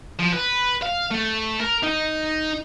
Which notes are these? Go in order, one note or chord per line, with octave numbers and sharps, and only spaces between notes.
F3
B4
F5
A3
A#4
D#4